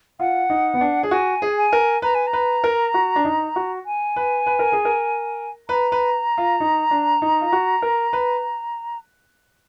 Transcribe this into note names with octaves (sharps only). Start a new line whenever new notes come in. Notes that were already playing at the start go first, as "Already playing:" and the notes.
F4 F#5
D#4
B3
D4
G#4
F#4 G#5
G#4
G#5
A#4
B4 A#5
G#5
A#5
B4
A#4
F#4
D4
D#4
F#4
G#5
B4
B4
A#4
G#4
A#4
B4 A#5
B4
F4
D#4
D4
D#4
F4
F#4
A#4
B4